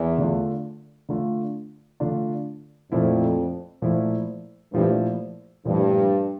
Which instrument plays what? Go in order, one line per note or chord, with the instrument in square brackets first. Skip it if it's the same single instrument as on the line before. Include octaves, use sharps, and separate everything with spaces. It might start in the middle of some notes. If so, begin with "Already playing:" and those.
Already playing: [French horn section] E2
[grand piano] D3 A3 D4 F4
D3 A3 D4 F4
D3 A3 D4 F4
[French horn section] F2 [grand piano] A#2 F3 A3 E4
[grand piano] A#2 F3 A3 E4
[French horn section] G2 [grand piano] A#2 F3 A3 E4
[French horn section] G2 [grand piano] A#2 F3 A3 E4